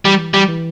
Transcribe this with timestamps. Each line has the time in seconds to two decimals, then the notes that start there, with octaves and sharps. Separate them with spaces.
0.05 E3 G3
0.34 G3
0.48 E3